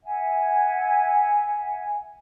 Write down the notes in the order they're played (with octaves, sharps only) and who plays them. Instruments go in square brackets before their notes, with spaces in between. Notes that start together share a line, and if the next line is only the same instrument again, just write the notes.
[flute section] E5 F#5 G#5